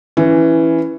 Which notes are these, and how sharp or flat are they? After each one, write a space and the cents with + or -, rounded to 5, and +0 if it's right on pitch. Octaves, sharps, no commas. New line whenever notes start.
E3 +0 C#4 +0